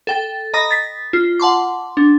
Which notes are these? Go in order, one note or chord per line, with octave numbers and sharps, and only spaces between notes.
A4 G5 A6
D#5 A#5 B5 D#6 A#6
A6 B6
F4
F#5 A5 C6 D6
D4